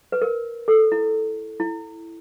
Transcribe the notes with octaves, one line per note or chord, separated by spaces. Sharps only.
B4
A#4
A4
E4
E4